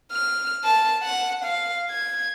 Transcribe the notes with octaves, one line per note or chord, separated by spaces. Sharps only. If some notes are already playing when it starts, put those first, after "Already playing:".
F6
A5
F#5
F5
G#6